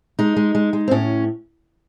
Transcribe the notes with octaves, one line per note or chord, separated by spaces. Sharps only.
G#3 D#4
G#3
G#3
G#3
C4
A2 C#4